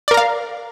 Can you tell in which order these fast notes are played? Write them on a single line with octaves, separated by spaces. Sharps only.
D5 A#4 A#5 F5